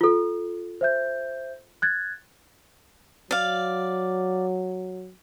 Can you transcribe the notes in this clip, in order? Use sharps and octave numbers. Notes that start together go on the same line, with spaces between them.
F4 A4
C5 E5 G6
F#6 G#6 A6
F#3 D5 F5